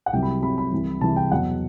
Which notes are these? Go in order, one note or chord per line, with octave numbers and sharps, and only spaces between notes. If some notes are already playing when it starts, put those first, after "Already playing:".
F#5
C2 C3 F#3 G5
B5
C2 C3 F#3 B5
B5
C2 C3 E3
C2 C3 E3 A5
G5
E2 B2 F#3 F#5